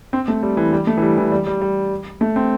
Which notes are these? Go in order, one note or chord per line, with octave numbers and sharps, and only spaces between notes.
C4
A3
G3
E3
G3
A3
E3
G3
E3
G3
G3
G3
A3
C4